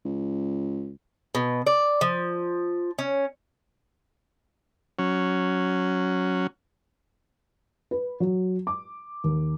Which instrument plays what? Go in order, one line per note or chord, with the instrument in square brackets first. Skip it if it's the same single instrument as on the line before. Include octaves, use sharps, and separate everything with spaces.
[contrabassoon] C#2
[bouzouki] B2
D5
F3
C#4
[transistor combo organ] F#3 C#4
[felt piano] B4
F#3
D6
D#2